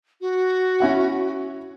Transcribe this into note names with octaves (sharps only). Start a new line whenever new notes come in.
F#4
C#4 E4 F#5